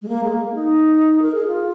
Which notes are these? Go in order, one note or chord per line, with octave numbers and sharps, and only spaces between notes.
G#3
A#3
G#3
A#3
D#4
A#4
G#4
F4